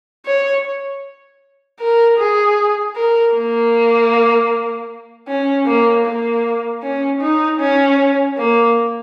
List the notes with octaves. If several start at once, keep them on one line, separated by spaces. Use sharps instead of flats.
C#5
A#4
G#4
A#4
A#3
C#4
A#3
A#3
C#4
D#4
C#4
A#3